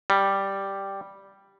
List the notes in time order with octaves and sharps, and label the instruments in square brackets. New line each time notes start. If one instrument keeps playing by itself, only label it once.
[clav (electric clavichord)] G3